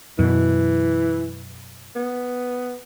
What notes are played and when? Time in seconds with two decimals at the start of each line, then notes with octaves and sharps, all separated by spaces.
0.19 F#2 B2 E3
1.96 B3